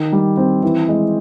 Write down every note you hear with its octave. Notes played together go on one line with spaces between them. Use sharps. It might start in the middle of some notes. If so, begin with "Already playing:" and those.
Already playing: D#3
G3
C4
E3
G#3